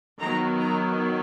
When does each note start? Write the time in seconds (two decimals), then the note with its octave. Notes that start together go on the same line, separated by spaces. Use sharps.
0.19 D#3 F#3 B3 A#5
0.60 A#5